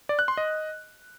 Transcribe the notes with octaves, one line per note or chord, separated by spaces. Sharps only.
D5
F#6
C6
D#5